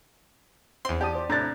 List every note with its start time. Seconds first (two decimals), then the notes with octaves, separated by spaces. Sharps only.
0.85 E2 C4 C6
1.01 G4 D5 A5 D#6
1.15 C5 D5
1.30 A2 C3 D4 A#5 F#6 A6